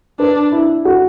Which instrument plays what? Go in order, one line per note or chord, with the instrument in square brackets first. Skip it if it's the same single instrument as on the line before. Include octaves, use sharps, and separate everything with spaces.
[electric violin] D4 [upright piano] B4
[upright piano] E4
F#4